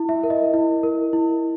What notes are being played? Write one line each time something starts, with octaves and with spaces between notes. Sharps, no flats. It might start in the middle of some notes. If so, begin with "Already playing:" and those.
Already playing: E4
E5
A#4
D#5
E4
A#4
E4